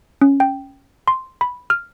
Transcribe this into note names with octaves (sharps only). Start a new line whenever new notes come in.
C#4
G5
C6
B5
F6